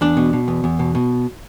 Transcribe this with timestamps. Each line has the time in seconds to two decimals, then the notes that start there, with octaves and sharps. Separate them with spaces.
0.01 E2 D4
0.17 B2
0.33 B2
0.48 E2
0.64 E2
0.79 B2
0.95 B2